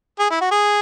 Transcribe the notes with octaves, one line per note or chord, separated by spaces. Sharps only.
G#4
E4
F#4
G#4